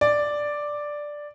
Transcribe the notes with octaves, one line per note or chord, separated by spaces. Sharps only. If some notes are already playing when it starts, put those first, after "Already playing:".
D5